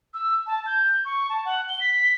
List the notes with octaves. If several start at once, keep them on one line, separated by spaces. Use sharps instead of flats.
E6
A5
G6
C#6
A5
F#5
G7
B6